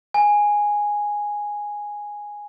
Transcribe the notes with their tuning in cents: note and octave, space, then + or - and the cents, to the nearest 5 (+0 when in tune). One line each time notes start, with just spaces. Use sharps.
G#5 -5